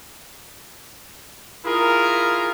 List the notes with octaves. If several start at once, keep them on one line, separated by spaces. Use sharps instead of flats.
E4 F4 G#4 A#4